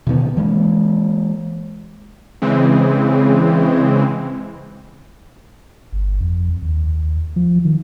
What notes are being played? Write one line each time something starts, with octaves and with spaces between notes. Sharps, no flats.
B2 D3 D#3 B3
E3 G#3 A#3
C#3 E3 G#3 C4
G1
F2
D#2
F3
D#3